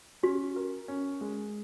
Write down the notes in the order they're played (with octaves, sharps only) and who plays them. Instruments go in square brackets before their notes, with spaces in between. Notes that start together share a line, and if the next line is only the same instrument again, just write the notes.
[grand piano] C#4 [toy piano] F#4
[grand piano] A#4
C#4
G#3